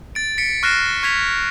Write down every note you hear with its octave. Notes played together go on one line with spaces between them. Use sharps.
A6 D7
B6 C#7 D7
C#6 F6 F#6 A#6 C7 E7
C#6 G#6 B6 F7